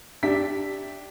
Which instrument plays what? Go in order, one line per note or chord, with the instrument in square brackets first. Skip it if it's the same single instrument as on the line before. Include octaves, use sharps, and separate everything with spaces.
[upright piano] D4 G4 E5 B6